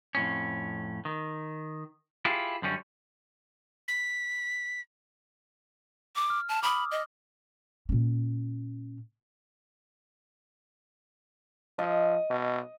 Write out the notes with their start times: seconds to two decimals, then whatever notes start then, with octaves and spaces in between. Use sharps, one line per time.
0.15 F2 A2 C#4
1.05 D#3
2.25 E4 F4 G4 G#4
2.62 F#2 D3 G3 C#4
3.88 B6
6.16 D6
6.30 F6
6.49 A5
6.63 B5 D6 D#6
6.91 D#5
7.89 A#2 C#4
11.79 F3 D#5
12.30 B2